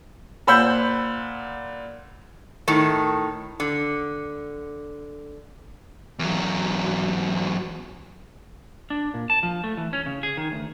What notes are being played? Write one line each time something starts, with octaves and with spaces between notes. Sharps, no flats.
A#2 C5 F#5 B5 E6 G6
A2 D#3
D3
E2 F#3
D4
A#2
A5
F3
A3
E3
C#4
C#3
G#4
D#3
D2